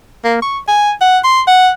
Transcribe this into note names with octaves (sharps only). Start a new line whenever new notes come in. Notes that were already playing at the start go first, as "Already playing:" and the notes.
A#3
C#6
G#5
F#5
C6
F#5